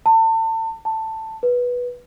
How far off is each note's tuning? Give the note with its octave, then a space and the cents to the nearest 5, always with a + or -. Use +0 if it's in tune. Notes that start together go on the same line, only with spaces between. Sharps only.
A5 +35
A5 +10
B4 -10